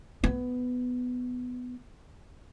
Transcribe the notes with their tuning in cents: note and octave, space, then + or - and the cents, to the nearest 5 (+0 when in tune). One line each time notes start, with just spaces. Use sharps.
B3 +10